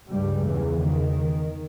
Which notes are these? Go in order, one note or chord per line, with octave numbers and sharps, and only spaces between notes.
C#2 G2 C#3 G3
E2 E3
D#3